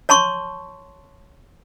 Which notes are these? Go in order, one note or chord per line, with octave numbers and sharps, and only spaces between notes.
C#5 A5 C6 C#6